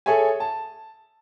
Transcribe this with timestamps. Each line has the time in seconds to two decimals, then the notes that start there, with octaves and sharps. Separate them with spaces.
0.06 G#4 A4 C#5 E5 G#5
0.40 A5